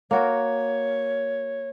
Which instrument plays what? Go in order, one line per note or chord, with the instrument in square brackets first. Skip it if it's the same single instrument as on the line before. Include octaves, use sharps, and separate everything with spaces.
[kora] A#3 F#4 A#4 [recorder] C#5